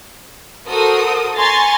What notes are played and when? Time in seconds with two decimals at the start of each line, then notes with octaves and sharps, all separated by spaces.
0.67 F#4 A4 A#4 C5 D#6
1.37 G#5 A#5 C6 C#6 A6